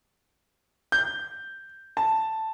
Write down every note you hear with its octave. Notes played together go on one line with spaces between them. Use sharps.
G6
A5